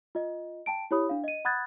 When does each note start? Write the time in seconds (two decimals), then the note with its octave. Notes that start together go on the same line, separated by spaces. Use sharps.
0.15 F4 D#5
0.66 G5 A5 D7
0.91 E4 G4 C#5 B5 D#6
1.09 D4 F5
1.24 D#5 D#7
1.45 F#5 B5 D#6 F#6 G#6 A6